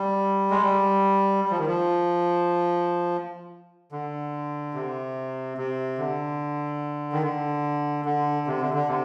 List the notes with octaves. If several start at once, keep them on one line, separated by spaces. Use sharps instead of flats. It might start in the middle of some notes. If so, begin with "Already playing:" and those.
Already playing: G3
G#3
G3
G3
F3
D#3
F3
D3
C3
C3
D3
D#3
D3
D3
C3
D3
D3
C3